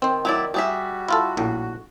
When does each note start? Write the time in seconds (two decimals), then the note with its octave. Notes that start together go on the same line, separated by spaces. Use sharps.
0.02 D#3 C4 C5
0.25 F#3 E4 D5
0.54 G3 F#4 G#4 E5
1.08 E4 F4 A4
1.37 A#1 A2